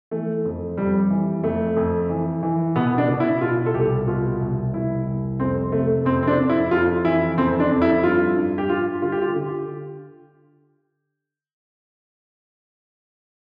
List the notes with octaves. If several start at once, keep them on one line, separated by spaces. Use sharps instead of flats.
E3 A3
F2
F2 G3
E3
F2 A3
F2
E3
E3
B2 B3
D4
B2
E4
B2 F4
A4
C2 G4
B2 F4
C2
C2 E4
C2
F2 C4
C3 A3
F2 C4
C4
D4
F2
E4
F2 F4
E3 E4
F2 C4
D4
F2
E4
G2 F4
G2
G4
G2 F4
D3 F4
G4
F4
D3 G4